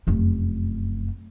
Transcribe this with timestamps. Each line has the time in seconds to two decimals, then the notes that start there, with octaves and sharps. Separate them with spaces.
0.07 F1 F#2